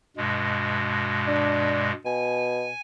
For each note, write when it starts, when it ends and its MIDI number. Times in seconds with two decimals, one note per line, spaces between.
0.17 1.92 43
0.17 1.92 47
0.17 1.92 56
1.27 1.88 62
2.05 2.69 47
2.05 2.81 80